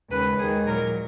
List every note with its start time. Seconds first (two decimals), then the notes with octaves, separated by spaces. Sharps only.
0.10 D#2 C#3 G#3 B4
0.38 D#2 D#3 G#3 G#4
0.67 A#2 F#3 A#4